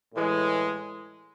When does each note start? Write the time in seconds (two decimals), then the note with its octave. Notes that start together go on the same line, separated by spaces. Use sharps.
0.13 A2 E3 G#3